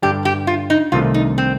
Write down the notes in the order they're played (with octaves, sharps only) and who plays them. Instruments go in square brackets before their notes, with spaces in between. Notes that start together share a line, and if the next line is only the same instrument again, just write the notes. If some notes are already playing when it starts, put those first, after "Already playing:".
[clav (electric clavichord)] G2 D3 G3 D4 [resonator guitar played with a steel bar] G4
[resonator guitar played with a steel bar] G4
F4
D#4
[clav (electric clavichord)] C2 C3 D#3 A3 [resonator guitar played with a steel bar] F4
[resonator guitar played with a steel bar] D#4
C4